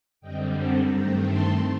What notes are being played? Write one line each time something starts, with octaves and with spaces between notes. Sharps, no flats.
F#2 D3 G3 C4 D#5 G5
F#5 A5
G2 D#3 A3 C4 G5 A#5
A5 C6